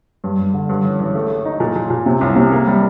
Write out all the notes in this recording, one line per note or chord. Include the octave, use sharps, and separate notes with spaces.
G2
G2
D3
G2
A1
A1
A3
A3
D#4
A#2
A#2
A#2
C3
C2
C3
A#3
G3